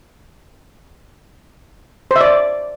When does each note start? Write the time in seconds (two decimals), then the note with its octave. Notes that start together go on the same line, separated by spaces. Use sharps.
2.11 C5
2.16 E5
2.21 D5